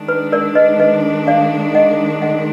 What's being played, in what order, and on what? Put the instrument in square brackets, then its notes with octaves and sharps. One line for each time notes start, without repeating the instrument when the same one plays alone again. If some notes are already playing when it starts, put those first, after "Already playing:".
Already playing: [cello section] D#3 G#3 D4
[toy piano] B4
A#4 D5
B4 D#5
B4 D#5
D5 F5
D#5 F#5
D#5 F#5